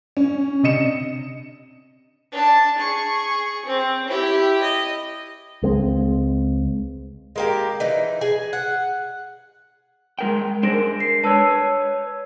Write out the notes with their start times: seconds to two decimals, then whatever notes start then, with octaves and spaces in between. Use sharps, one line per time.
0.17 C#4
0.63 C3 D4 D#5 C#7 E7
2.32 D4 A5
2.78 G#4 C#6
3.66 C4
4.08 E4 G4
4.62 D#5
5.62 C#2 G#3 C4
7.36 G#3 A#3 G4
7.80 E3 D#4
8.21 G#4 G#5
8.53 F#5
10.19 G#3 A#4 G5
10.63 G#3 D4 A#4 C5 A#6 D7
11.00 C7
11.24 B4 C#5 A5 E6